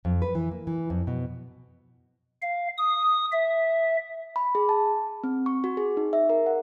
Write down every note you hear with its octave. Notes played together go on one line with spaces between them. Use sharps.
F2
B4
E3
A#3
E3
F2
B2
F5
D#6
E5
B5
G#4
A5
C4
C#6
F#4
G#4
D#4
E5
A#4
F#5